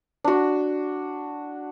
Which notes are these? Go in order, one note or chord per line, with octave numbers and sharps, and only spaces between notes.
D4 F#4